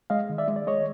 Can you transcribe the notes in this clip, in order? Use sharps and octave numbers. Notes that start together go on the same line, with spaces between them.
G#3 D#5 F5
D#3
D5 E5
G#3
D5
G#3 C#5 D#5